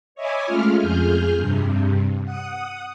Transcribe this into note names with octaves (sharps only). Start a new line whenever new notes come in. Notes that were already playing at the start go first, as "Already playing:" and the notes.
C#5 D#5 E5 G#5 B5 D6
G#3 A3 C#4 F4 F6
F2 G#4 F6 G6
G2 C3
F#5 D#6